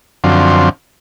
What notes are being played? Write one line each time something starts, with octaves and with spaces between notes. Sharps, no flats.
F#2 D3 F3 C4